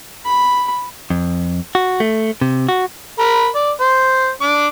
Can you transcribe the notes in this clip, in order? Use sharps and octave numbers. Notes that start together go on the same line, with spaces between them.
B5
F2
F#4
A3
C3
F#4
A#4 B5
D5
C5
D4 D6